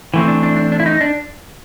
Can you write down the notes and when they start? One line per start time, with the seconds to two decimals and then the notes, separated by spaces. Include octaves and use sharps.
0.14 E3 A3 C4
0.28 D4
0.43 D4
0.57 D4
0.72 D4
0.80 E4
0.86 D#4
1.01 D4